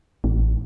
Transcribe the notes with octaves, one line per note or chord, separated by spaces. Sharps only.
A1